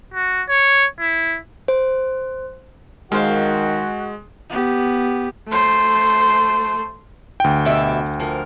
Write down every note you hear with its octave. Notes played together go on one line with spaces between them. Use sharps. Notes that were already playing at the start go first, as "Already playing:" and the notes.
F#4
C#5
E4
C5
D#3 G#3 F#4 A#4 C5 F5
B3 G4
A3 C5
D2 G5
B2 G4 E5
F3 A#4